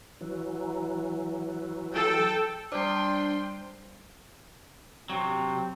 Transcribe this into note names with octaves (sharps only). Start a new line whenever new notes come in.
E3 F#3
A4 G5
G3 D4 C5 G5 C6
C3 F#3 C4